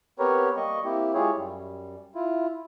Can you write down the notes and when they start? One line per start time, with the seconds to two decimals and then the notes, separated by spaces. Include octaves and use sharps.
0.19 B3 C4 G4 A#4 B4 C#5
0.56 G3 A#3 D#5 C#6
0.85 A#3 C4 E4 G4
1.14 G#3 E4 F4 G4 G#4 C#5
1.36 F#2 G3
2.15 E4 F4